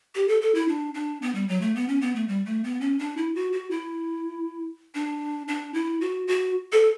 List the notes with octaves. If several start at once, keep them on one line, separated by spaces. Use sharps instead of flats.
G4
A4
A4
E4
D4
D4
B3
G3
F#3
A3
B3
C#4
B3
A3
G3
A3
B3
C#4
D4
E4
F#4
F#4
E4
D4
D4
E4
F#4
F#4
A4